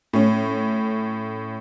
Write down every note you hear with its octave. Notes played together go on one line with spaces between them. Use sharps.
A2 C#4